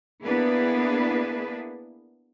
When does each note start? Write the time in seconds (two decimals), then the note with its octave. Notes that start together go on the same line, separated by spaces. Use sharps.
0.23 A#3 B3 D4 E4 G#4 B4